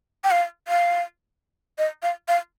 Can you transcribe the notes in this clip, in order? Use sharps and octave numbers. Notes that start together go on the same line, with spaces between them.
G5
F5
F5
D#5
F5
F5